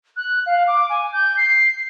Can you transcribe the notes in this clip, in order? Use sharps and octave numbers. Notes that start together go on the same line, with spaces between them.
F#6
F5
D6
G#5
G6
C7